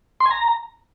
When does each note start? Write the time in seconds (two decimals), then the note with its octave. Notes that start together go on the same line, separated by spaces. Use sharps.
0.20 C6
0.26 G#5
0.31 A#5